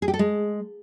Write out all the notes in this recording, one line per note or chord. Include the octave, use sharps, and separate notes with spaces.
G#4
G4
A4
G#3